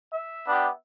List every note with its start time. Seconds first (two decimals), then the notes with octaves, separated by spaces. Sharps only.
0.13 E5
0.46 B3 D4 G4